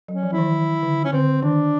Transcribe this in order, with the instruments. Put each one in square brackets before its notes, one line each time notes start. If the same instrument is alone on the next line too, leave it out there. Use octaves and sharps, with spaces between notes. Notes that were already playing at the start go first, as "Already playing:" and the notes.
[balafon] F#3 [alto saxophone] C#4
[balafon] F3
[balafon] E3 [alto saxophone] E4
[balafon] D#3
D#3
D3
[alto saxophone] C#4
[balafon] D3 [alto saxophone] C4
[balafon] D#3 [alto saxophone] D4